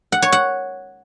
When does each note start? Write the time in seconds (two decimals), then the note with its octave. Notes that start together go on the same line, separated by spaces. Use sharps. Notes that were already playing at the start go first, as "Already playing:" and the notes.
0.12 F#5
0.22 C#5
0.32 F#5